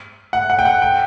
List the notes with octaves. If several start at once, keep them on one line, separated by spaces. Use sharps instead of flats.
F#5
F#5
G5
F#5
G5